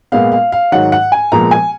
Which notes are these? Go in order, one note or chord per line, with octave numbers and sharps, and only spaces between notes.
A#2 G#3 B3 F5
F5
F5
G#2 D#3 F#3 F#5
F#5
G#5
A#2 F3 G#3 B3 A#5
G#5